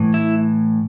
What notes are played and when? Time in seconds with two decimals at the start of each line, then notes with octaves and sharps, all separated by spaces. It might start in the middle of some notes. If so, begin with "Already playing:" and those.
Already playing: A2 E3
0.14 E4